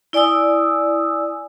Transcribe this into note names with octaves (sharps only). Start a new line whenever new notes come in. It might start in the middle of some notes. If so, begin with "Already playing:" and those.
E4 D5 G#5 D#6 E6